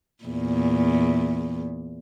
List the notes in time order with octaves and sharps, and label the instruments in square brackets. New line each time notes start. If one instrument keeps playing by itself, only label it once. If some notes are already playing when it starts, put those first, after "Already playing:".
[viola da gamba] E2 A#2